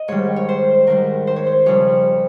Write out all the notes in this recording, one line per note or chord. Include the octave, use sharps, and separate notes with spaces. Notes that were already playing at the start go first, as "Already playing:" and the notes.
Already playing: D#5
G#2 D#3 G3 C#5
C#5
C5
G#2 D#3 G3 A#4
C5
C#5
C5
F2 C#3 G3 C#5